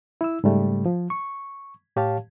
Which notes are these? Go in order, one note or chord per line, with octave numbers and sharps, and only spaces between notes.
E4 E6
G#2 C#3 G3 A3
F3
C#6
A2 G4 C#5 F5 A5